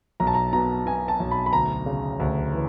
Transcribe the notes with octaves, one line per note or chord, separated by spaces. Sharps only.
B1 A#5
A5
A#5
B2 A#5
B2 G#5
A5
B1
B5
B5
D2 A#5
C#3
D2
E3